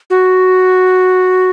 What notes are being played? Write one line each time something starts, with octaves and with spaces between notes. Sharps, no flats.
F#4